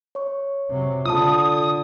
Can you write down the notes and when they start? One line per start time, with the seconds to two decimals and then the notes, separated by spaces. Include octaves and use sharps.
0.15 C#5 C#6
0.69 C3 F#3
1.05 D3 F4 A5 D#6